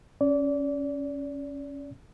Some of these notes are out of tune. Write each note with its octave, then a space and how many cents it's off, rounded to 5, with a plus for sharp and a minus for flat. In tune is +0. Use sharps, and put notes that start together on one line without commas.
C#4 +0 D5 -30